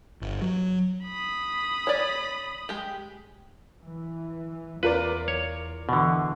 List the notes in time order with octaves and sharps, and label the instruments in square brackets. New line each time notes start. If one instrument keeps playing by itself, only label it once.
[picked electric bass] G1
F#3
[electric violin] B5 D#6
[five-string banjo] C#5 D5
G#3 G4
[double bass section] E3
[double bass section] E2 [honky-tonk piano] F4 A#4 D5 [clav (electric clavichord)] B4
[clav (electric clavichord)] C#5
[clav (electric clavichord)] B2 D3 [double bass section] E3